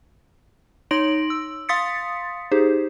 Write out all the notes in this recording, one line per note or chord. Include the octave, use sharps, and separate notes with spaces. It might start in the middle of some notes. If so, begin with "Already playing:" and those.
D#4 C#5 C6 A#6 D7 F#7
E6
F5 C6 D#6 A6 B6 C#7
D#4 G4 G#4 C5